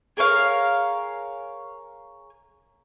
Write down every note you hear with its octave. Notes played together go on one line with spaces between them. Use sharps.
G#4 A#4 C#5 F5